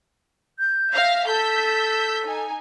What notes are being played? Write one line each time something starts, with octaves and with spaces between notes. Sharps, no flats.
G6
E5 F5 A#6
A4 E6 G6 B6
D#4 G#5